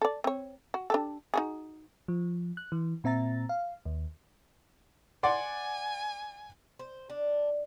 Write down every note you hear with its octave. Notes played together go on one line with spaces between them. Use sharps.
A4 D5
C4 C#5
F#4
D4 G4 A4
D#4 F#4 G#4
F3
F#6
E3
A#2 C4 E5 A#5 A6
F5
D#2
D5 F#5 G#5 C6
C5
D4